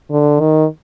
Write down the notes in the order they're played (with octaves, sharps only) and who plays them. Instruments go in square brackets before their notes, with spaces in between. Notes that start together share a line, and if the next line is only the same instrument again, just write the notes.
[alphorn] D3
D#3